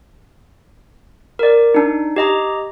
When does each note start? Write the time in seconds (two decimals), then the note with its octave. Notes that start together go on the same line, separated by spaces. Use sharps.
1.39 A#4 D5
1.74 D4 D#4
2.16 G4 D#5 A#5